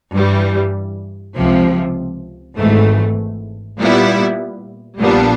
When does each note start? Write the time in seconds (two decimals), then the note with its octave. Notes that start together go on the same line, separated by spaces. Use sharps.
0.14 G2 E3 G3
1.36 C#2 C3 F3
2.57 G#1 G#2 E3 A3
3.79 A#2 G3 B3 E4
5.00 A#1 A#2 G3 B3 D4